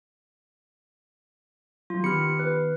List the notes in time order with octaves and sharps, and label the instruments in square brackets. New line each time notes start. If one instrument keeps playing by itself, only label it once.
[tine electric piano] F#3 [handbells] F4 C6
[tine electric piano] D#3 B3 F6 [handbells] G4 B5 C#7
[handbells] B4